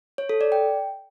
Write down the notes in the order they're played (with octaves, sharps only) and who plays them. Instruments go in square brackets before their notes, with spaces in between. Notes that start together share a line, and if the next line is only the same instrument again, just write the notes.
[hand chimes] C#5
A4
D5
G5